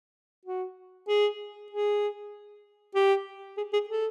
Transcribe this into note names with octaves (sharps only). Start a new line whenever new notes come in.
F#4
G#4
G#4
G4
G#4
G#4
A4